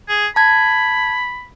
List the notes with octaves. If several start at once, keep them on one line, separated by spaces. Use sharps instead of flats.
G#4
A5 B5 G#6